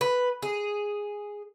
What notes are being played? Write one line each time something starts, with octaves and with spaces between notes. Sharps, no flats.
B4
G#4